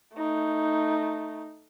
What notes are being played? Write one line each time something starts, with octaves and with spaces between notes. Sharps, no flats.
A3 D#4